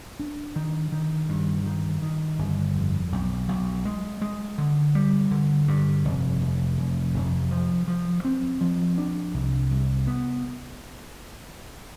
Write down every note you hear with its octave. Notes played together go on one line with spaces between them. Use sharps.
D4
D#3
D#3
G2
D#3
D#3
G1
F2
B1
B1
G#3
G#3
D3
G3
D3
G2
F1
F1
F1
F1
F3
F3
C4
F3
D4
C2
C2
B3